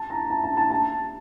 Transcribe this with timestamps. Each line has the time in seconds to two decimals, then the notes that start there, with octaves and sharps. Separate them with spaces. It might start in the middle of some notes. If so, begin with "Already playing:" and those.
Already playing: A5
0.10 A#5
0.30 A5
0.44 A5
0.57 A5
0.70 A5